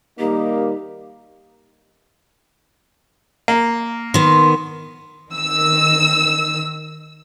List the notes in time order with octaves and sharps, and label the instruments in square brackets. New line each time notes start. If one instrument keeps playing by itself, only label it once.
[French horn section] D#3 G3 A#3 [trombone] D#4 [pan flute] G4
[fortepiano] A#3
[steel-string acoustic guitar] D#3 B3 [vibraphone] C6
[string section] D#3 E6